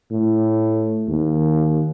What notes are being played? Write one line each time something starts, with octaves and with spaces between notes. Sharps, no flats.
A2
D#2